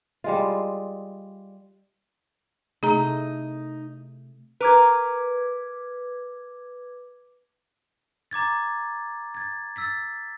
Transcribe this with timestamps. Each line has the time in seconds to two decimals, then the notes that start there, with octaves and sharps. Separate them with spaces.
0.24 G3 G#3 F4
2.83 C3 A3 D#4 G#4 A#5
4.61 A#4 B4 D6 G#6
8.31 A#5 D6 G#6 A6
9.35 G#6 A6
9.76 E6 A6 B6